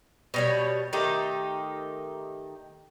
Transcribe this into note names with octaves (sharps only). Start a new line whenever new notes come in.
B2 G3 C#5
D#3 A3 D#4 G4